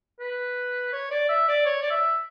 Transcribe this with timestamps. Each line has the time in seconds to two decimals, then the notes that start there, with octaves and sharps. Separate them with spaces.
0.20 B4
0.93 C#5
1.11 D5
1.29 E5
1.48 D5
1.66 C#5
1.82 D5
1.90 E5